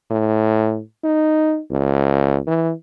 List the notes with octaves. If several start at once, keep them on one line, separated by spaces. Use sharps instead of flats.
A2
D#4
C#2
E3